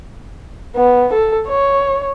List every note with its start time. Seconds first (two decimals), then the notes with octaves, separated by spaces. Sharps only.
0.76 B3
1.13 A4
1.48 C#5